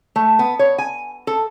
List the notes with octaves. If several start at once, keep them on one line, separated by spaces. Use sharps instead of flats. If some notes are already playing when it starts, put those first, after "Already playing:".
A3
B3
C#5
G#5
A4